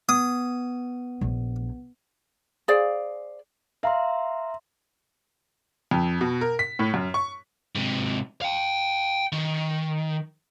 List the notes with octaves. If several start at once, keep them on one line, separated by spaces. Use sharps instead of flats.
B3 D#6
A#1
G#4 C5 D5 F5
E5 F5 A#5 C6
F2
B2
A#4
B6
A2
F#2
C#6
G#2 C3
F5 G5
D#3